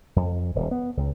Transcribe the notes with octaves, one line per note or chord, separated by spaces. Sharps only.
F2
D#1
B3
C#2